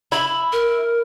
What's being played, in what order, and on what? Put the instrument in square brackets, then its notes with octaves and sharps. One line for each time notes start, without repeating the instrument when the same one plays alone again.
[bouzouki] E4 [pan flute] B5
[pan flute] A#4